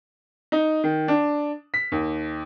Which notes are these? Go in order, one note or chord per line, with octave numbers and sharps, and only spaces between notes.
D#4
D#3
D4
B6
D#2